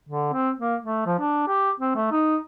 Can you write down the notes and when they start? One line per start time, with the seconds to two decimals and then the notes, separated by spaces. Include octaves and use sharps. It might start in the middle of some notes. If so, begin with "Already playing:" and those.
0.09 D3
0.33 C4
0.59 A#3
0.83 A3
1.06 F3
1.19 D4
1.48 G4
1.80 C4
1.96 A3
2.12 D#4